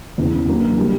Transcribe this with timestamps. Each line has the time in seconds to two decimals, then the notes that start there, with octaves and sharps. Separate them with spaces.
0.18 E2 C#3 E3
0.48 D3 F#3 A#3
0.78 D3 G3